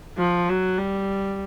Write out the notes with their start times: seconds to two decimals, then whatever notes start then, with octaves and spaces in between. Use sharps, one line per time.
0.18 F3
0.49 F#3
0.78 G3